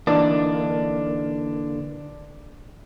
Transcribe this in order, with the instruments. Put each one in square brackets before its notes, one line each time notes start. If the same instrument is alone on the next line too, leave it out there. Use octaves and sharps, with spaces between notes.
[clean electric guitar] D3 A#3 [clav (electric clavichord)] E3 D#4 [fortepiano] D4